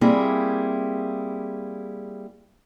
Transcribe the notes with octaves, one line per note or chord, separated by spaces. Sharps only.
G3 A#3 C4 E4 G#4